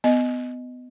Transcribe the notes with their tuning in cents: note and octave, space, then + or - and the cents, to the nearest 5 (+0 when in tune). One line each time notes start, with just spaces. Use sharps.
B3 +25 D#5 +0